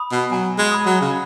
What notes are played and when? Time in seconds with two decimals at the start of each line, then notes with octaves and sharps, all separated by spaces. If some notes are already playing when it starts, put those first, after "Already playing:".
Already playing: B5 D#6
0.12 B2
0.31 F#3 G#5
0.58 G#3
0.72 B5 D#6
0.86 F#3
1.01 C#3